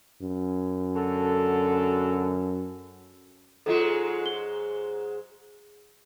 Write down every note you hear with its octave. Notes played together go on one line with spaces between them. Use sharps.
F#2
D3 F#4 A4
G#2 F#3 G#3 F4 A4
G7